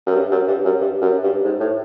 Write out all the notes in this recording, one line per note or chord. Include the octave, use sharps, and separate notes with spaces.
F#2
G2
F#2
G2
F#2
G2
F#2
G2
G#2
A2